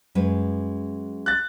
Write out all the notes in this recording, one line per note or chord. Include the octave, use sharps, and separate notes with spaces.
F#2 G#3 B4
F#6 A6